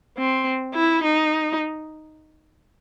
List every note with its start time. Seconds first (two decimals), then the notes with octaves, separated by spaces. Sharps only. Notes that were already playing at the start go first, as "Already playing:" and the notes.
0.17 C4
0.74 E4
1.04 D#4